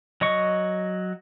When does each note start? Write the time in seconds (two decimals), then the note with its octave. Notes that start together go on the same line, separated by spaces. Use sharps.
0.21 F#3 D#5 C#6